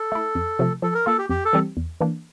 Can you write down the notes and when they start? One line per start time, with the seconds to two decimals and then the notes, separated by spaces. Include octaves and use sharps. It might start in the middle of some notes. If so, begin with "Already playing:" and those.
Already playing: A4
0.12 A3 E4
0.35 F2
0.59 C3 F3 A3
0.82 F3 A4
0.95 A#4
1.06 A#3 F4 A4
1.18 G4
1.29 F2 G4
1.45 A4
1.53 E3 G3 C4 G4
1.77 E2
2.01 E3 A#3 D4